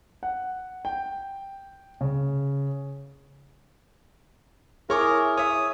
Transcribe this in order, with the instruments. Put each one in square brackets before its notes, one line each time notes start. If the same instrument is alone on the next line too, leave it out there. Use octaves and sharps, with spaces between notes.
[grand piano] F#5
G5
C#3
[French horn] E4 [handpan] G#4 [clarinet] A#4 [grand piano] C#5 C#6 D6
[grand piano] C#5 E5 [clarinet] D#6